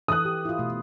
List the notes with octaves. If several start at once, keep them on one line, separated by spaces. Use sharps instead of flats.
E3 A4 D#6 F#6
G4
E4 F4
B2 A3